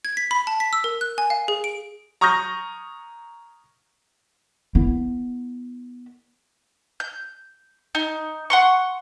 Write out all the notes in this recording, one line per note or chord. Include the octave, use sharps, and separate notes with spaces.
G#6
B6
B5
A5
B6
E6
A#4
F#6
G#5
F5
G#4
D7
A#5 C#6 D#6 F6 G6 A#6
B3 E4
G6
D#4
F#5 C6 C#6